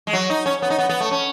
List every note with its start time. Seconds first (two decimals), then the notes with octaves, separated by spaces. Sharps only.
0.07 G#3
0.13 F#3
0.30 D#4
0.46 C#4
0.62 B3
0.70 D#4
0.79 B3
0.89 B3
1.00 A3
1.11 C#4